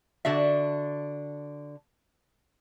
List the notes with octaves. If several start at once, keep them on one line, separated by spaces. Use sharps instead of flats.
D3 D4 F#4 E5